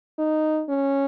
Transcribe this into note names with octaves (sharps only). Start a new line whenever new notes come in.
D#4
C#4